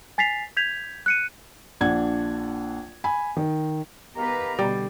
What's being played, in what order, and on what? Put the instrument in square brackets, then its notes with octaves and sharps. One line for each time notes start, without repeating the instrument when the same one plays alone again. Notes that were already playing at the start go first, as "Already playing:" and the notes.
[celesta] G#5 A6 B6 C7 F7
G6 G#6 B6 F7
F#6 C#7 D#7
[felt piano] A#1 D4 F#5 G#6
G#5 B5
D#3
[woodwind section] D#3 F5 A#5 [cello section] B3 G4 B4
[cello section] B2 D3 [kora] G3